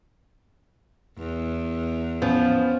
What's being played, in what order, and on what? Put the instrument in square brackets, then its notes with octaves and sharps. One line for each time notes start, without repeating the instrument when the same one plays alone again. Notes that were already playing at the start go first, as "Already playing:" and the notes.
[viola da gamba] E2
[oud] F3 [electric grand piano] B3 C#4